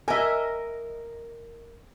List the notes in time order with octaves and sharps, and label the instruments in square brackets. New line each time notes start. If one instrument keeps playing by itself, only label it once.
[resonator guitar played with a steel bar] A#4 D#5 [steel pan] E5 G#5